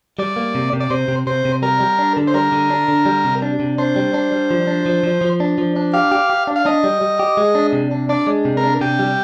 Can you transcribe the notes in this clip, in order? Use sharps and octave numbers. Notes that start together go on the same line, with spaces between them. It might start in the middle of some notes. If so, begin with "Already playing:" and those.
G3 D5
A#3
C3
C3
D5
C3 C5
C3
C3 C5
C3
G3 A#4
G3
D4
D3
C5
G3 A#4
D3
D4
D3
G3
C3
D4
C3
D4 C5
G3
D4
G3
F3
D4
F3
F3
F3
D4
F3
D4
G4 F5
G4
G4
D4
F5
D4 D#5
G3
G3
G4
G#3
D4
C3
D4
D4 D5
G#3
C3
A#4
D4
C3 G4
G3